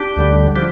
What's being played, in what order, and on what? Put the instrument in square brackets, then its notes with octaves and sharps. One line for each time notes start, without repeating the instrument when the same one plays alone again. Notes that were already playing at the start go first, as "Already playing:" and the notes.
Already playing: [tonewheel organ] D4 G4
D2 D3 G3
F3 D4 G4